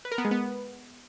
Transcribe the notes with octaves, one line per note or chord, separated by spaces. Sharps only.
B4
A#4
B3
G#3
B3